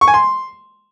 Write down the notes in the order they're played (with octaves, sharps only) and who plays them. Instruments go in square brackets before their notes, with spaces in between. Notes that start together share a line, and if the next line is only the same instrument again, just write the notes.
[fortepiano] C#6
G#5
C6